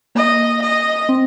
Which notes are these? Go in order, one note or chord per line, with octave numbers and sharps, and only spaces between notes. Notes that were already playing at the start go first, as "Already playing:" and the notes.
A#3 D#5
D#5
C4